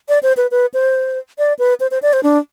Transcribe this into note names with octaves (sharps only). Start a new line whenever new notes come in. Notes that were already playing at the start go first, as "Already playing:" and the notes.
D5
C5
B4
B4
C5
D5
B4
C5
C5
D5
C5
D4